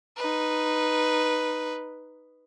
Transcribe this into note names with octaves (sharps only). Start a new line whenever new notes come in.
D#4 B4